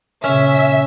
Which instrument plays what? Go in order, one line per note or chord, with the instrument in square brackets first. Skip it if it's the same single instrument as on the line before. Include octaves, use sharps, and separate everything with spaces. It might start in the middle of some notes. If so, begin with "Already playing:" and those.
[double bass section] A#2 C#3 [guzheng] C#4 [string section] E5